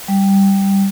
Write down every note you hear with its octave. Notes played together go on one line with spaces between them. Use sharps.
G3